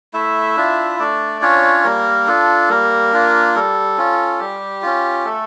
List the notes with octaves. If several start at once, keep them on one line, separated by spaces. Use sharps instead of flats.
A3 E4 E5
D4 F4
A3 D4 D5
C#4 D4 F4 C#5
G3 A#3 A#4
D4 F4 A4
G3 A#3 A#4
D4 F4
G3 A4
C#4 F4
G3 G4
C#4 F4
A3 A4